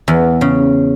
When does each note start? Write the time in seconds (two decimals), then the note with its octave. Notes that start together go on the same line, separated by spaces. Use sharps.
0.08 E2
0.41 C#3